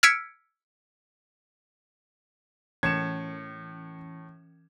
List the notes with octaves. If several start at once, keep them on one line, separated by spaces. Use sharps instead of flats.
E6 F6 G#6 B6 C#7 D7
A2 E3 C#4 G#6 C#7 E7